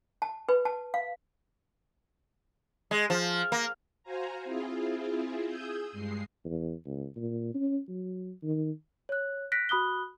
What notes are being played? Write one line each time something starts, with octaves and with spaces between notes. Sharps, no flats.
A5
B4
A5
F5
G#3
F3
A#3
F#4 C5 F5 G#5 A#5
C4 E4 F4 G#4
G#4 G#5 D#6 E6 G6
G2 G#3 C7
E2
C#2
A#2
C#4
F#3
D#3
C#5 F#6
F#6 A#6 B6 D7
F#4 B5 D#6 F#6 G7